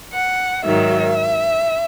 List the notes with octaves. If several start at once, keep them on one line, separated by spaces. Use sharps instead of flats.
F#5
G#2 D#3 F#3 E5